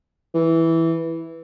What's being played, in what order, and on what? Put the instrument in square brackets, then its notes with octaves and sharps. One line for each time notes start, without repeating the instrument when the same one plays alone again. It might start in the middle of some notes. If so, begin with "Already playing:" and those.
[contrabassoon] E3